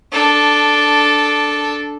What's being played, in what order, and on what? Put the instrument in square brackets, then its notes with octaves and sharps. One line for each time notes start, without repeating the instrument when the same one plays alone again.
[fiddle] D4 A4